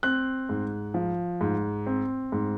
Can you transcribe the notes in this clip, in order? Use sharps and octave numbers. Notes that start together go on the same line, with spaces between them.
C4 F#6
G#2
F3
G#2
C4
G#2